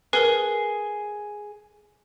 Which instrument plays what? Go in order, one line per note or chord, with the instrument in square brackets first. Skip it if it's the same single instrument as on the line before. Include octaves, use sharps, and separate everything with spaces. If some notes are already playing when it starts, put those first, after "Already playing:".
[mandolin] G#4 [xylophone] A#4 B4